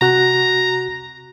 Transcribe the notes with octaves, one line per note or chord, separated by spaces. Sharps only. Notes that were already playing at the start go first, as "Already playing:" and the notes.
C3 F#4 A#5 F#6